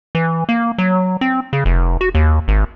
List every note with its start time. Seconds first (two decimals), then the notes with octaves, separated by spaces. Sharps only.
0.15 E3
0.49 A#3
0.78 F#3
1.21 C4
1.53 C#3
1.66 F1
2.01 F#4
2.15 D#2
2.48 G#1